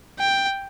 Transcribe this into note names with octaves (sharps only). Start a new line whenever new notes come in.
G5